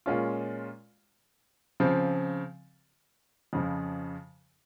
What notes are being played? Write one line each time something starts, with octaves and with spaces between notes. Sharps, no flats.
A#2 G#3 C#4 F4
C#3 F3 C4
F2 C#3 F3